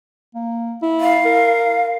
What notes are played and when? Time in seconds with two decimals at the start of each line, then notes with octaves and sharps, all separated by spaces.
0.35 A#3
0.82 E4
1.00 F5
1.25 A#4